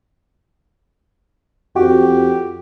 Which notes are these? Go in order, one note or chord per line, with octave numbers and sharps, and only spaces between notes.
F2 F#4 G4